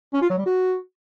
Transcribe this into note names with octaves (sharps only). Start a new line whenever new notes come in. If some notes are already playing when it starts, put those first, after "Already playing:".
C#4
F4
F#3
G3
F#4